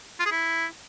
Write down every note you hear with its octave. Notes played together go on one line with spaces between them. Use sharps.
F4
G#4
E4